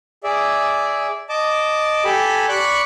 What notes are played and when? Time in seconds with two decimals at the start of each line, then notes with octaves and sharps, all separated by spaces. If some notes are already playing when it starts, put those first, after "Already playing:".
0.24 G#4 D5 E5
1.29 D#5 A5 D6
2.05 G4 A4 G#5 A5 B5
2.49 D5 B5 C#6 F#6